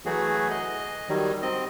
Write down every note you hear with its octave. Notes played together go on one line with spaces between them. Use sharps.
E3 F#3 A3 F#4 G#4
D#5
D#3 F#3 G3
C4 D#5